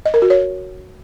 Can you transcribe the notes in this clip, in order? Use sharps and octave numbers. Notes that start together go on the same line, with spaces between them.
D#5
A#4
F#4
C#5